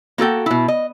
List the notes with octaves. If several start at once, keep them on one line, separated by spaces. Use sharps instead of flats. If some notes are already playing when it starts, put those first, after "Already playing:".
A#3 F#4 A4 G5
B2 E4
D#5